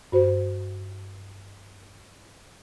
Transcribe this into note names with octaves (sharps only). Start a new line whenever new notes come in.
G2 F#4 C5